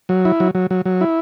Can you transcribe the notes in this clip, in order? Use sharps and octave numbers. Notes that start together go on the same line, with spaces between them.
F#3
E4
F#3
F#3
F#3
F#3
E4